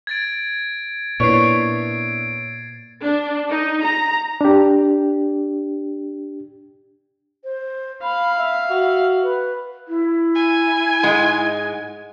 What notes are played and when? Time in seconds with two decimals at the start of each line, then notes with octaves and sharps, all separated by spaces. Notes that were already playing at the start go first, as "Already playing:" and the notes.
0.07 G#6 A6 D7
1.20 A#2 B3 D4 E4 C#5 C7 D7
3.02 D4
3.51 D#4
3.84 A#5
4.41 D4 G4
7.44 C5
8.03 F5 B5
8.38 E5
8.70 F#4
9.23 B4
9.88 E4
10.35 G#5
11.03 G#2 G#3